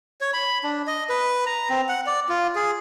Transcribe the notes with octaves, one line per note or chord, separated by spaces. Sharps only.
C#5
B5
D4
D#5
B4
A#5
C4
F#5
D5
F4
G#4